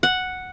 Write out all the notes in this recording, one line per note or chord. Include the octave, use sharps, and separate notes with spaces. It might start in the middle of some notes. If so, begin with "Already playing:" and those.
F#5